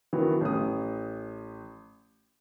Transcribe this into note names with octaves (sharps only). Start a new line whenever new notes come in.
D#3 E3 F#3 B3
A1 D#6